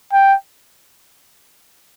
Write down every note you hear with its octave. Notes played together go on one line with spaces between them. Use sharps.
G5